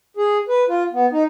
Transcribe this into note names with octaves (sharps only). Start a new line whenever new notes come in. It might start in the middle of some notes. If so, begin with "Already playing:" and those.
G#4
B4
F4
B3
D#4